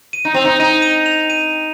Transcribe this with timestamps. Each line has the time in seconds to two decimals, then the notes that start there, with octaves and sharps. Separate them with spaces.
0.13 D#7
0.25 D#4
0.34 C4 F7
0.45 D#4
0.60 D#4 D#7
0.82 D#7
1.06 F7
1.30 D#7